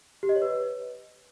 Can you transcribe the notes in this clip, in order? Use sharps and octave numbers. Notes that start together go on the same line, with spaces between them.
G4
D#5
C#5
B4